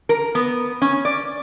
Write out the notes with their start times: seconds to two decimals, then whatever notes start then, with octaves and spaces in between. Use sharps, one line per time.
0.09 A#4
0.35 B3
0.82 C#4
1.05 D5